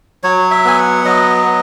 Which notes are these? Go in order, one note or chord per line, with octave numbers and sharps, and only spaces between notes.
F#3 C#5
E5
B3 G#5
F#5
F#3 D#5
B3